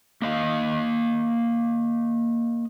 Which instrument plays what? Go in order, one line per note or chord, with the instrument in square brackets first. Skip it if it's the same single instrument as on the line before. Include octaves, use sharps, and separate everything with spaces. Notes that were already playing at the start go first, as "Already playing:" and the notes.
[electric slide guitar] A#3 D#5 F5